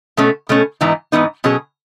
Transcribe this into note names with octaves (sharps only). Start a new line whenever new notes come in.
B2 A3 C#4
B2 A3 C#4
G#2 E3 B3 D#4
G#2 E3 B3 D#4
B2 F#3 C#4 G#4